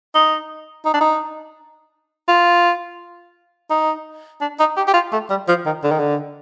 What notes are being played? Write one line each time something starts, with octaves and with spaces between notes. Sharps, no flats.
D#4
D#4
D4
D#4
F4
D#4
D4
D#4
G4
G4
F4
A3
G3
F3
D#3
D3
D#3
D3